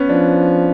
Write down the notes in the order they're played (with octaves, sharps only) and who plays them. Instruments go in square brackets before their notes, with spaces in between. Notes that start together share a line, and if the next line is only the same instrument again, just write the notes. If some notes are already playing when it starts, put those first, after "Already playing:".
Already playing: [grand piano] B3 C#4
[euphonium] F3 [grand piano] D4